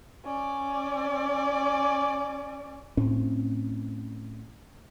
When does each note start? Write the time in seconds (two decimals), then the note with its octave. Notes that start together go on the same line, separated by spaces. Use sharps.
0.24 C#4 D5
2.97 A2 C4 C#4